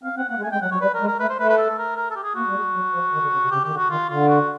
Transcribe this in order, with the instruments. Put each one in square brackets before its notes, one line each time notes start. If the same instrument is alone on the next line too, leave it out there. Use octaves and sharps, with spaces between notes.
[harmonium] C4 [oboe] F5
[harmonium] C4 [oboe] F#5
[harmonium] A#3 [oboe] F#5
[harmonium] G#3
[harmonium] A3 [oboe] G#5
[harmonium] G#3 [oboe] G5
[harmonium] F#3 [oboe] F#5
[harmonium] F#3 [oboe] C#5
[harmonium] G3 [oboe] B4
[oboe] A#4
[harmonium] G#3
[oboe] A#4
[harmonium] A3 [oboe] B4
[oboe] C5
[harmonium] A3 [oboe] B4
[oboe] B4
A4
A#4
A#4
A4
G4
G#4
[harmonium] A#3 [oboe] F#4
[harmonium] G3
G#3
F#3
F3
D#3
D3
C#3
C3
[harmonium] C#3 [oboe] G4
[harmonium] D#3 [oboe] G4
[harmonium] D3
[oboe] F#4
[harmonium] D#3 [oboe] F4
[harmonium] D3 [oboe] F4
[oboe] F#4